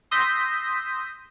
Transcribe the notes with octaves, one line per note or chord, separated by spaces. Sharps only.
C6 D#6 E6 G6 A#6 B6